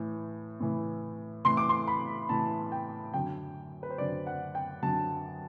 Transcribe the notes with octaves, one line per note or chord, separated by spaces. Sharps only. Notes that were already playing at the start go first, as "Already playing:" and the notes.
Already playing: A2 E3
A2 E3
A2 E3 C6
D6
C6
B5
A2 E3 A5
G5
F#2 D3 G5
B4
C5
F#2 D3 D5
F#5
G5
F#2 D3 A5